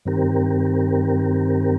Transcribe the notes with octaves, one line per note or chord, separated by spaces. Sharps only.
G2 D#3 C4 G4 A#4